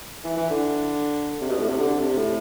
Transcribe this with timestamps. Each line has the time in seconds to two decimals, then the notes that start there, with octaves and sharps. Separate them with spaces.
0.24 E3
0.36 E3
0.50 D3
1.41 C3
1.49 B2
1.59 A2
1.69 C3
1.80 D3
1.99 C3
2.17 A2